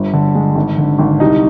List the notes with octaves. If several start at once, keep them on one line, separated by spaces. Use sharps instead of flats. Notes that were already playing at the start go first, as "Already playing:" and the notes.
Already playing: G1
D3
G#3
G#1
D3
G#1
C2 D#4